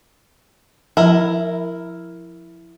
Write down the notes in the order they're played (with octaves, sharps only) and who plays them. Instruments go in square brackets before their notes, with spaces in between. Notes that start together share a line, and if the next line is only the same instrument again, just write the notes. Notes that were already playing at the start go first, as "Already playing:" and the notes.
[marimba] F3 [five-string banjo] E4 A#4